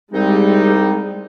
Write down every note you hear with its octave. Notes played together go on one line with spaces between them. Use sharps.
C2 G3 G#3 C4 D#4